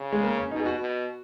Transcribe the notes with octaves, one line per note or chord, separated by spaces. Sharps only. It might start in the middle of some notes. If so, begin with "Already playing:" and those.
Already playing: C#3
G#3
A#3
C#4
B2 D#4
G#4
F#4
B2